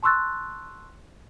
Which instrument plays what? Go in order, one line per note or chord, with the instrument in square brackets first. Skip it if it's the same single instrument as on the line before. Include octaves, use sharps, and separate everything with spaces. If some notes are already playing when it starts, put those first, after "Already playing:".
[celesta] A5 C6 C#6 E6 F#6 A6